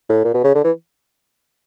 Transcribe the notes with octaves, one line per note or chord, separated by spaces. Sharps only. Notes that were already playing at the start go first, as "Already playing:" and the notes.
A2
A#2
B2
C#3
D3
E3